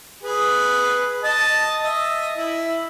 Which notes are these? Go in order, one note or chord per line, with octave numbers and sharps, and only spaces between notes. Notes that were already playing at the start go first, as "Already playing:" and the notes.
G#4 B4
D#5 A5
D#5 E5
E4